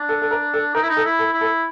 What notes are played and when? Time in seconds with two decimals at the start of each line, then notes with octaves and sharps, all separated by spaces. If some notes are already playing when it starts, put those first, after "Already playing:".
Already playing: D4
0.09 A4
0.22 A4
0.31 A#4
0.54 A4
0.74 D#4 A#4
0.82 E4
0.89 D#4
0.97 A4
1.05 E4
1.19 A4
1.33 E4
1.41 A4